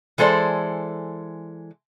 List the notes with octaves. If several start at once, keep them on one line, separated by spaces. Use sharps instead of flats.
E3 G#3 A4 C5 D5